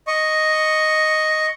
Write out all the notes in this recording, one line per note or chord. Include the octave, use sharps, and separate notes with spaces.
D#5 C#6